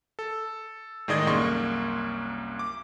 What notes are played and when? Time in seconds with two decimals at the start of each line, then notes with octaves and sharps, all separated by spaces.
0.19 A4
1.08 A2 D#3 G#3 D5 D#5 G#6
1.27 C2 F#2 A#3 C6 C#6
2.59 D6